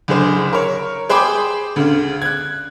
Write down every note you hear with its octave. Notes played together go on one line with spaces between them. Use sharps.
F#1 D2 G#4 C5
A#4 C#5
G#4 C5 G5 B5 D6
D2 C#3
F#6 G#6